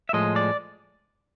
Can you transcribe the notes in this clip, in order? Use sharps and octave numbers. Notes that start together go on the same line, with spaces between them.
E5
A2 F3 G#3 D#5
D5